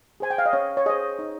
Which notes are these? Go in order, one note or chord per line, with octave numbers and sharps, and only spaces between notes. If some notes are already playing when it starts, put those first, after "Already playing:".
G#4 C5 G#5
G5
F5
D#5
C#4 C#5
C#5
G#4 C5 D#5
D#4